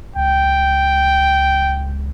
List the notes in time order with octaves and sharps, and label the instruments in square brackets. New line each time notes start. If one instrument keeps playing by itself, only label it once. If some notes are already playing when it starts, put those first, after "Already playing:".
[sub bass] C#2 [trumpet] G5